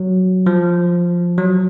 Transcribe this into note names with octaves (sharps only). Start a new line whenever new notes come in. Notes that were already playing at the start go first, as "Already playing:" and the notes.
Already playing: F#3
F3
F#3